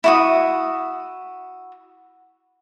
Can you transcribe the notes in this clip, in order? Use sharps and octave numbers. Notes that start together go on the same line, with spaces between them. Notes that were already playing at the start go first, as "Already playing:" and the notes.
E4 F#4 D#6